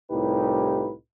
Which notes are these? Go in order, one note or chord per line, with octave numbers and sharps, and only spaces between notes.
C2 A2 D#4 F4 G4 B4